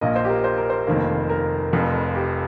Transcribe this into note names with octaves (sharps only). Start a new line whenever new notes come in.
A#1 A#2 A#3 D#5
C5
G4
A#4
C5
A#4
C5
F1 F2 D#3 A#3
A#4
F1 F2 F3
G4